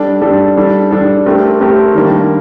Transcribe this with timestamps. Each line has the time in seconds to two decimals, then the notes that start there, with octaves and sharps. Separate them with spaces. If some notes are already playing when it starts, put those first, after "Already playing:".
Already playing: G3 D4 A4
0.22 G3 D4 A4
0.57 G3 D4 A4
0.91 G3 D4 A4
1.26 A3 C4 G4 A#4
1.61 A3 C4 G4 A#4
1.94 D#3 G3 A#3 D4